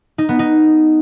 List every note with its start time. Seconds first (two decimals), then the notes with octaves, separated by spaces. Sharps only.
0.18 D#4
0.29 B3
0.39 D#4